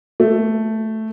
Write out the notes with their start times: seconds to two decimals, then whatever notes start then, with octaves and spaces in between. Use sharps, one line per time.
0.20 A3